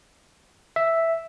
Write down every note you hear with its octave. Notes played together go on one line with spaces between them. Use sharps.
E5